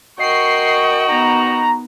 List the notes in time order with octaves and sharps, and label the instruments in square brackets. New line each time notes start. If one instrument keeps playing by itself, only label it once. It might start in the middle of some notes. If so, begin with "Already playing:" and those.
[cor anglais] F#4 [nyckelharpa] A#4 C#6 [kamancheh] D#5 G5 [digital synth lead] C7
[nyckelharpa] B3 D#4 [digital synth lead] A#5